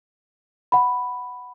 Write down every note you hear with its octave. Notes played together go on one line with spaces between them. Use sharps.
F#5 B5